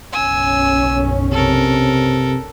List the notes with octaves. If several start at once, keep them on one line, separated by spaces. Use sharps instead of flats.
F#1 B1 C#4 G#5 E6
C3 A4 A#4